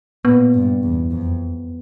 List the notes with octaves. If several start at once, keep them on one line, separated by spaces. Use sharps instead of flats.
A#2 B3
G2
E2
F2